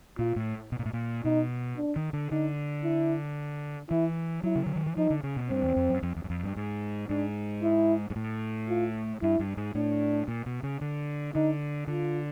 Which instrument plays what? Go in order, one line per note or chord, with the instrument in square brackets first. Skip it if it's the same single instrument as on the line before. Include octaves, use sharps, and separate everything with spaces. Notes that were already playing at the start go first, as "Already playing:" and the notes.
[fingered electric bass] A#2 [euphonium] F4
[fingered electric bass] A2
B2
A#2
A2
A#2
[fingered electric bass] B2 [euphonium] D#4
[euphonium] D4
[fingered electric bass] D#3
D3
[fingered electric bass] D3 [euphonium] D#4
[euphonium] E4
[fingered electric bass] E3 [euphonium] E4
[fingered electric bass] F#3 [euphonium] E4
[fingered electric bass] C#3
D3
D#3
E3
[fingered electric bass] F3 [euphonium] D#4
[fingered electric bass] D3
C#3
B2
[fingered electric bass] G2 [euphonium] C4
[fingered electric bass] E2
F2
F#2
F2
E2
F#2
F2
G2
G#2
[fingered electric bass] G#2 [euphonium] D4
[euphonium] E4
[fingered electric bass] G#2
A2
[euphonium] F4
[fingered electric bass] G2 [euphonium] E4
[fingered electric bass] G2
G#2
[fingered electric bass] A2 [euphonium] D4
[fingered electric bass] A#2
B2
C#3
D3
[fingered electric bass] D3 [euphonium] D#4
[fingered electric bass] D3 [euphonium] F4